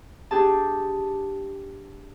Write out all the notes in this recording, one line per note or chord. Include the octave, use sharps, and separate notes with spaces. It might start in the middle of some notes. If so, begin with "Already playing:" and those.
D4 G4 G#4 A5